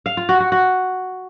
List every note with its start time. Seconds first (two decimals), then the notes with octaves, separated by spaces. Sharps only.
0.06 F5
0.17 F4
0.29 F#4
0.40 F#4
0.52 F#4